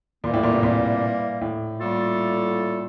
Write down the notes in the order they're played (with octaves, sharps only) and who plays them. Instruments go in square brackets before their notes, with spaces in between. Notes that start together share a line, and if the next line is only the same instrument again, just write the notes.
[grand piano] A#2 [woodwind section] E3 G3 A#3
[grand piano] A2
A#2
C3
A#2
A2
[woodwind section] A2 G3 A#3 F4 A4